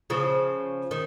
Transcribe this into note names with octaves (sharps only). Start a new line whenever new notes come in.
C#3 F3
D#3